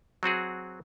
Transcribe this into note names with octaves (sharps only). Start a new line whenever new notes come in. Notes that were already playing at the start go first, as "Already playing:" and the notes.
F#3 C4 F#4 G#4